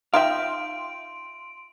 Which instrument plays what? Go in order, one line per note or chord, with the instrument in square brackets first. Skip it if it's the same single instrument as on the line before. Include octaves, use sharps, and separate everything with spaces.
[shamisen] D#4 F4 E5 [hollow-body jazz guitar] F5 G5 [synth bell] C6 D7